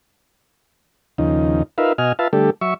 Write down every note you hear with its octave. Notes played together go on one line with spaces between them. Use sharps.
D#2 C#3 F3 D#4
D#4 F4 A#4 B4 E5 F5
B2 F#4 D#5 G#5 F6
F4 B4 E5 F5 A5
D3 G3 A3 G4 A4
F#3 E5 C#6